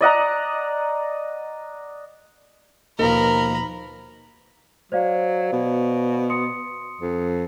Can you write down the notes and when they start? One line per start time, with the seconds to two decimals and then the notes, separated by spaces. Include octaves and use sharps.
0.01 D5 D#5 F#5 A#5
2.99 D#2 B2 F3 D#4 A#4 A#5 B5
4.92 F#3 C5 D5 F5
5.52 B2
6.30 C6 D#6 C#7
7.01 F2